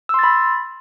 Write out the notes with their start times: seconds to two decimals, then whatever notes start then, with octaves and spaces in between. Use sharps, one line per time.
0.09 E6
0.14 C6
0.19 A6
0.24 B5